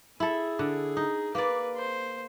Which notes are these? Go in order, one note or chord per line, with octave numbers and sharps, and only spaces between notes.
E4 G#4 A4
D3
D#4
A#3 B4 D5
C5